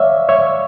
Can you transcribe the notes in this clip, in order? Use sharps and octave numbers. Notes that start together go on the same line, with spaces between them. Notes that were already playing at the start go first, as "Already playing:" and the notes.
Already playing: C#5 D5 E5 F5
C#5 E5